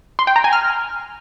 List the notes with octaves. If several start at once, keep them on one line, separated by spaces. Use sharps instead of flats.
C6
G5
A#5
G#5
F6